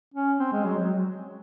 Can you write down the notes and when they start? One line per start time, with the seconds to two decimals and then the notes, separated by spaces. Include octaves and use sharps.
0.14 C#4
0.40 C4
0.53 G#3
0.65 F#3
0.79 F#3